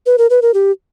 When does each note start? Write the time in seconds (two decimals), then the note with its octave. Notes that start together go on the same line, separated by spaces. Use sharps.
0.06 B4
0.18 A#4
0.30 B4
0.42 A#4
0.54 G4